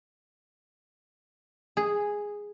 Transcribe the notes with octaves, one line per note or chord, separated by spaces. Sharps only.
G#4